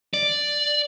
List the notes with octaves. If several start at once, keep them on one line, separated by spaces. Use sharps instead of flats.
D5